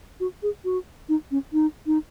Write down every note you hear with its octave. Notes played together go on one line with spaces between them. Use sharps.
F#4
G#4
F#4
D#4
C#4
D#4
D#4